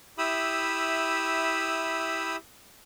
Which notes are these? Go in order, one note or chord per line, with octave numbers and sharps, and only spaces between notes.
E4 G4 E5 B5 D#6 E6